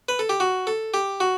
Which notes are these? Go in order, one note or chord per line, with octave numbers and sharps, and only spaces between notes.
B4
A4
G4
F#4
A4
G4
F#4